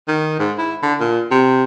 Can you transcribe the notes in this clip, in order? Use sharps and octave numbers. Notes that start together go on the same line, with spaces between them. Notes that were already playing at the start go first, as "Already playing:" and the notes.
D#3
G#2
E4
D3
A#2
C3